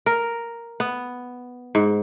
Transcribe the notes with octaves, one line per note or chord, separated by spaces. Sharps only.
A#4
B3
G#2